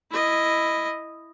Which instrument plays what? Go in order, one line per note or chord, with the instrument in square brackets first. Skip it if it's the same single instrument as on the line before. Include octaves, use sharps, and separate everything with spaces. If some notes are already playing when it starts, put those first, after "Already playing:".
[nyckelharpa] E4 D#5